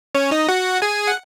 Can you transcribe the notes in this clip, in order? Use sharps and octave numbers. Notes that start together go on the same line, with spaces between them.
C#4 C#5
D#4 D#5
F#4 F#5
G#4 G#5
F#5